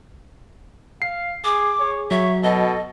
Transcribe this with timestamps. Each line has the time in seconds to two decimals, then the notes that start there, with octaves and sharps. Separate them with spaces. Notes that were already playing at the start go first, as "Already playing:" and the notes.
1.02 F5 C7
1.44 G#4 D6
1.80 G#4 C#5
2.11 F#3 C#5 E5
2.43 B2 A4 D#5